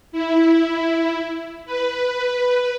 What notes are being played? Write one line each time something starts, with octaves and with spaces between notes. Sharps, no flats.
E4
B4